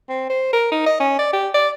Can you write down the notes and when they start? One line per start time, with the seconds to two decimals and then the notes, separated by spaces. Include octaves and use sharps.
0.09 C4
0.30 C5
0.53 A#4
0.72 D#4
0.86 D#5
1.00 C#4
1.19 D5
1.33 G4
1.54 D5